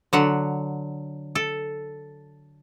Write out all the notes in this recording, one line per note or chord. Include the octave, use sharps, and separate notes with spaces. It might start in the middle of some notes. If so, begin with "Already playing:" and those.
D3 F#3 F#5
A4